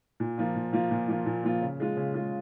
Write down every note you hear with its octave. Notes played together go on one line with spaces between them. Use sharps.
A#2
F3 A#3 F4
A#2
F3 A#3 F4
A#2
F3 A#3 F4
A#2
F3 A#3 F4
C#3
G#3 F4
C#3
G#3 F4